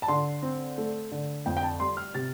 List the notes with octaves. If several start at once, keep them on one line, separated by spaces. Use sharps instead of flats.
A5
D3 C6
C4
A3
D3
F2 G5
G5
A5
G3 C6
F6
C3 A6